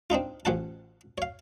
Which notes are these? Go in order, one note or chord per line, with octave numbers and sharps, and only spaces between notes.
C4 D4 D#4 F4
A1 F3 C#4 F#5 A5
C#5 F5